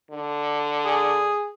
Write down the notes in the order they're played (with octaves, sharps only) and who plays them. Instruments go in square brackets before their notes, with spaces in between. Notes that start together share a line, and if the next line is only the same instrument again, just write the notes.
[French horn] D3
[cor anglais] G#4